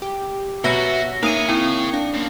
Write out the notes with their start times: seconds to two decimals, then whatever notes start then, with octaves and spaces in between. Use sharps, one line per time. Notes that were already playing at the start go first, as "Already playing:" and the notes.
0.02 G4
0.64 B2 F#4 A#4 C#5 E5 A#6 G7
1.23 A#3 D#4 C#5 F5 D#6 D#7
1.49 C4 E4 G5
1.94 D4 F5
2.14 C#3 A#3